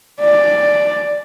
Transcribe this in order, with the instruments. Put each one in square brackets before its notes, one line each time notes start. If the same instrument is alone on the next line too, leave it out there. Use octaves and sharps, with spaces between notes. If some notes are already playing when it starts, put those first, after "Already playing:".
[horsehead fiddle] D5